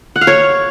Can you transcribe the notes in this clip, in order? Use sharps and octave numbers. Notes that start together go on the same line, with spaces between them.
F#5
F5
C#5